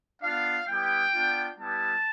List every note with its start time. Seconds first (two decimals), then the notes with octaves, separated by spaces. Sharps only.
0.23 B3 D4 F4 F5
0.68 G3 B3 E4 G4 G5
1.13 B3 D4 F4
1.58 G3 B3 E4 G4 A5